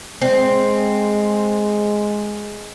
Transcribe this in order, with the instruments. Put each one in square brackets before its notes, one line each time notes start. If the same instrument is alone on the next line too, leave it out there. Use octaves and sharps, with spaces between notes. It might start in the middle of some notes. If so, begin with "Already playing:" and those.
[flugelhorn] G#3 [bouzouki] C4